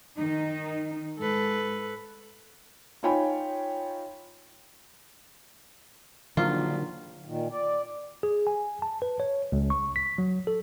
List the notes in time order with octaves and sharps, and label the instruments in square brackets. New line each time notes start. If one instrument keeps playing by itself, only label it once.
[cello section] D#3 D#4
[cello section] G#2 [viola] A4 B4
[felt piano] D#4 F4 C#5 G5 G#5 B5
[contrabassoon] A#1 [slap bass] D3 D#3 F#3 [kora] F4
[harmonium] A#2 D#3
D5
[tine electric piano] G#4
G#5
A5
B4
C#5
C#2
C#6
B6
F#3
A4